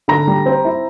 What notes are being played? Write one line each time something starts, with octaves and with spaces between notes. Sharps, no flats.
D3 A#5
G3
C4
E4